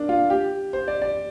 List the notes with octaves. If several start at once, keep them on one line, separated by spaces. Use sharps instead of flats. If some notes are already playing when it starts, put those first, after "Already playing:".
Already playing: A#3 D4
F4
G4
C5
D5
D5